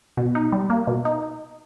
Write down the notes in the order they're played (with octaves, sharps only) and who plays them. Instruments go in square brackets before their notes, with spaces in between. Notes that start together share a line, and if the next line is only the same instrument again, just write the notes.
[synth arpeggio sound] B2
D#4
G3
A#3
B2
D#4